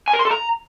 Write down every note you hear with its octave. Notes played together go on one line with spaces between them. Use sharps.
G#5
A#4
C6
A4
A#5